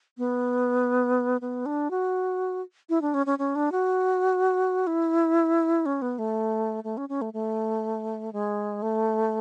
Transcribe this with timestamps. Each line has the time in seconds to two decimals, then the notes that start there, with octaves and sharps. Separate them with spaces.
0.18 B3
1.41 B3
1.66 D4
1.91 F#4
2.89 E4
3.02 D4
3.14 C#4
3.26 C#4
3.39 C#4
3.55 D4
3.72 F#4
4.87 E4
5.86 C#4
6.02 B3
6.19 A3
6.84 A3
6.97 C#4
7.09 C#4
7.21 A3
7.33 A3
8.33 G#3
8.82 A3